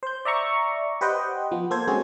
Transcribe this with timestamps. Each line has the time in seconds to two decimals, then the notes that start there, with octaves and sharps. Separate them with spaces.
0.03 C5 G6
0.25 D5 E5 A#5 C#6
1.01 G4 B4 C5 D#5 F#5 G5
1.51 F3 B3
1.71 A#3 A4 C5 G#6
1.88 G#3 C4 C#4 F#4 G#4 A4